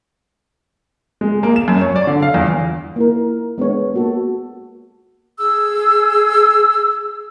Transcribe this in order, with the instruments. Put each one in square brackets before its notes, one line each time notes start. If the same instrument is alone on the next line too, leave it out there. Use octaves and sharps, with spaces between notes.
[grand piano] G#3
A#3
E7
F#2
C#5
D5
D3
F5
E2
[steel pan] A#3 E4 A#4
G#3 B3 D4 C#5
A#3 F#4 A4
[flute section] G#4 E6